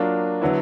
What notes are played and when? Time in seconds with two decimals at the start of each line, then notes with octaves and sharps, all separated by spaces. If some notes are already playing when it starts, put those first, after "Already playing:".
Already playing: F#3 A#3 D4 F4
0.41 D3 F#3 B3 E4